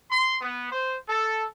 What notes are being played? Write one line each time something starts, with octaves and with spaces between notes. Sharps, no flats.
C6
B3
C5
A4